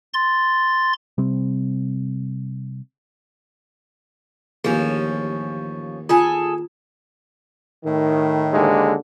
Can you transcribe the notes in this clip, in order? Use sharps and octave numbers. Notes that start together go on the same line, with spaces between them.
C6 A6
C3 G3 C4
A1 D#2 F3 A#3 C#4 G#4
F4 G#4 A4 G#5
A2 D#3
D#2 D3 G#3